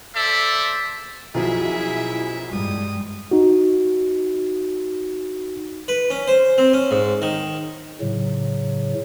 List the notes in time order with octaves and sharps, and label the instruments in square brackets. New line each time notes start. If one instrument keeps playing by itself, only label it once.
[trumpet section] A4 C5 D5 E5
[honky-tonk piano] B1 F#2 F3 [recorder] E4 [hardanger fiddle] G#4 E5
[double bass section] G2 G3 G#3 [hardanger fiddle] D#6
[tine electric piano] D#4 F#4
[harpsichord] B4
C#4
C5
C4
C#4
G#2
D#3
[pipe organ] A2 C#3 F#3